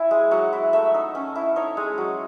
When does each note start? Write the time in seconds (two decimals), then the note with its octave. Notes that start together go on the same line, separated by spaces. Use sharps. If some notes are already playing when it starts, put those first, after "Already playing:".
Already playing: E4 G#5
0.11 G#3
0.31 F#3 F#5
0.53 E4
0.73 A3 E5
0.94 D#4
1.15 C#4
1.36 E4
1.56 D#4 C#5
1.77 G#3
1.98 F#3